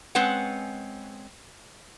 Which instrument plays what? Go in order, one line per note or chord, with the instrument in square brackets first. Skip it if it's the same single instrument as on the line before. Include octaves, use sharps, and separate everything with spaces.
[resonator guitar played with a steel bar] G#3 C4 C#4 B4 F#5